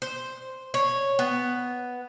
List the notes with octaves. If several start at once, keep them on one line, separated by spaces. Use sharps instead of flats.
C5
C#5
B3